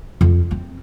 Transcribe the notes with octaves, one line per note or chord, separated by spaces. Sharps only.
F2
C4